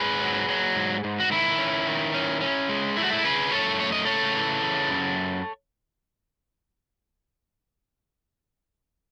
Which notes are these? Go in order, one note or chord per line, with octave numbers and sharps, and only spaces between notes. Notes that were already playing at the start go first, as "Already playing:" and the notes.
Already playing: G#2 G#4 B4
F#3
F#3
G#2
G#2
F#4
D#3 E4
C#4
D#3
C#4
C#4
G#3
A3 E4
F#4
E4
C#3 G#4 B4
F#2 A4 C#5
A3 C#5
D#5
C#3 A4 C#5
E3
C#3
F#2